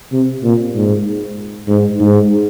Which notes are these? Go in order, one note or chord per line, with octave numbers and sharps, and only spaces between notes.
C3
A#2
G#2
G#2
G#2